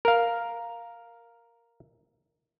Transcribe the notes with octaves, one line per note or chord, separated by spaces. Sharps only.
A#4 F5